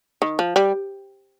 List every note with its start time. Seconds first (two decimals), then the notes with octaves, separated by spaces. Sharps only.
0.22 D#3
0.39 F3
0.56 G3